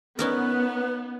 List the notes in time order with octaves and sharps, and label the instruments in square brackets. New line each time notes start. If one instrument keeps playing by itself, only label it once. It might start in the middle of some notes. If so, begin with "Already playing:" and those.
[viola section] B3 [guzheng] C#4 D#4 A#4 [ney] B4